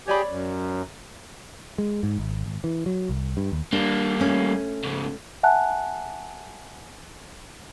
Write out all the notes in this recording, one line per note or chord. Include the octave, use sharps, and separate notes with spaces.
G4 G#4 C#5 D5 B5
F#2
G#3
G#2
G#1
G#1
E3
F#3
C2
G2
D#2
G3 A#3 D4
A3 C#4
G#2 C#3
E5 F#5 G#5 A5 F#6